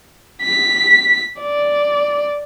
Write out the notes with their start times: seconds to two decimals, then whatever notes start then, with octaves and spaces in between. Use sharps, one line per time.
0.42 B6
1.40 D5